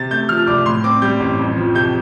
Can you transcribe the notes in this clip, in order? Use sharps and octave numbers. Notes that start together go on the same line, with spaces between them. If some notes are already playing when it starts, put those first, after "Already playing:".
Already playing: C3 A6
A3 G6
F3 F6
C2 D6
A2 C6
C4 D6
G3 G6
A1
F2
F3
C3 G6